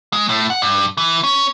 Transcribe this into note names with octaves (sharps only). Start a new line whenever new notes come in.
G#3
A2
F#5
G2
E3
C#4